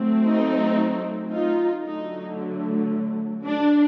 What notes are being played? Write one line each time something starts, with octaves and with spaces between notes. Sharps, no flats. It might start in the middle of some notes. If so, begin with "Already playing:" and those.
Already playing: F#3 A3 C4
D#4
D#4 F4
D3 F#3 A3 D#4
D4